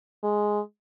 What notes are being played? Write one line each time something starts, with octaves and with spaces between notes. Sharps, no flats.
G#3